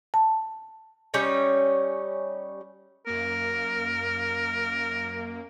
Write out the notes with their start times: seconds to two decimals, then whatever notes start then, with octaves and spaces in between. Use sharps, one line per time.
0.14 A5
1.14 G3 C#4 D#4 C#5
3.07 F#2 A#3 A#4